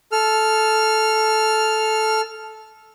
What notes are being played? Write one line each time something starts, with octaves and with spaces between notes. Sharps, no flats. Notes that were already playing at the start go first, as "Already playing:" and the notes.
A4 F6